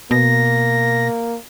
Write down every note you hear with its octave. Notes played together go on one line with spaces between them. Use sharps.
B2 A#3 A#6